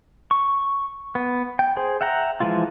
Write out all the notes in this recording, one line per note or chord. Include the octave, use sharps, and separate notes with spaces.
C#6
B3
G5
G#4 C5
E5 F#5 G5 A#5
E3 F3 G#3 E4 F4